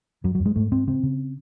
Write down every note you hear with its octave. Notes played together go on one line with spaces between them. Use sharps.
F#2 F#3
F#3
F#2
G#3
G#2 A3
G#2 C4
C#3 C4
C#3